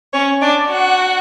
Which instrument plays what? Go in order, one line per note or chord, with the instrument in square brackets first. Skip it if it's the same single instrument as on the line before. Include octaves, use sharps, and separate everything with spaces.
[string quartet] C#4 C#5
D4 D5
F#4 F#5